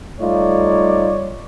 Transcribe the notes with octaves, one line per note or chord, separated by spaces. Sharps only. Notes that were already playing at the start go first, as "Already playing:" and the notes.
G3 A3 D#4 F4 C#5 D5